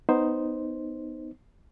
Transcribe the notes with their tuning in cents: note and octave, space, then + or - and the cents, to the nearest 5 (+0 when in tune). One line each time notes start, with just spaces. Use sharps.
B3 +15 D#4 +0 C5 +0